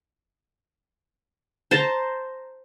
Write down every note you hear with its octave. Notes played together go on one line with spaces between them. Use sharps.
C5 A5 A#5